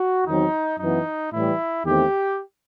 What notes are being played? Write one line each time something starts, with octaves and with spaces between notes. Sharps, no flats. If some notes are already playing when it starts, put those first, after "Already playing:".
Already playing: F#4
E2 D#3 F#3 C4 D#4
F#2 E3 B3 D#4
A2 E3 G3 E4
E2 D#3 A3 C4 G4